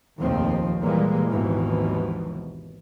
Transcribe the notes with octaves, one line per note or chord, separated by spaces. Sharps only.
F1 A#1 D#2 D#3 F3 C4
A#2 E3 G3 G#3 A#3
G#1 D#2 B2 E3 F3